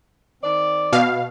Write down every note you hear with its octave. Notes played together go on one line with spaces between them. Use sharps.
D#3 C4 D5
B2 F5